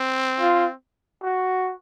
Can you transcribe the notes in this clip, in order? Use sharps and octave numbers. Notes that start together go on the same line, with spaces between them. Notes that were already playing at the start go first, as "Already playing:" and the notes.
Already playing: C4
F4
F#4